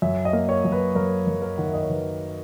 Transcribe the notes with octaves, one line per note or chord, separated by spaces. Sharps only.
F#2 E5
D#5
A#3
C#5
F#2
B4
F#2 A#4
F#2
A#4
D#3 F#5
E5
D#5
C#5
D#3 B4